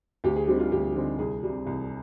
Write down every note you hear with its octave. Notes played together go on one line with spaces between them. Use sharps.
D2 G4
G#4
D3 G3 C4 D#4 G4
F4
D2 G4
D3 G3 C4 D#4
C2 G#4
C3 G3
C2